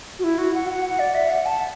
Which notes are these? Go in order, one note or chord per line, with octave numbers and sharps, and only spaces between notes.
F#4
E4
F#4
F#5
F#5
F#5
D5
E5
F#5
A5